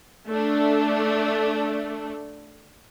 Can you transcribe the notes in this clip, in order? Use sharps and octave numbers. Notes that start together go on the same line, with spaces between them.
A3 D4